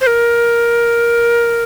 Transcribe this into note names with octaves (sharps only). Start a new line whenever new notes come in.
C5
A#4